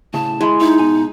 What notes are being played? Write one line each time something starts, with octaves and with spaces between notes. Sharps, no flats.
A2 C#3 A5
G#3 E4 G#5 B5
D#4 E4
B2 G#5